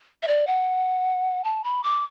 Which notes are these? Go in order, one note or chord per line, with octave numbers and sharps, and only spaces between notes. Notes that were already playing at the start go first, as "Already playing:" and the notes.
E5
D5
F#5
A5
B5
D6